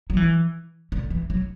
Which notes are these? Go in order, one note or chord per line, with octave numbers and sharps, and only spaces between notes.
F#3
E3
D3
E3
F#3